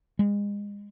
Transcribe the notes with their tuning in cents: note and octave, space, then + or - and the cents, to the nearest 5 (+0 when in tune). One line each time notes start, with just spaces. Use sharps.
G#3 -30